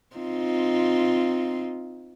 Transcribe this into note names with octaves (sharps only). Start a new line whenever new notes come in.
C4 D#4 F4